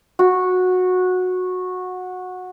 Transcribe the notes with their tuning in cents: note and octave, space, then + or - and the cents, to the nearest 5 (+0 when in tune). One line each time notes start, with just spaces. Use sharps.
F#4 -15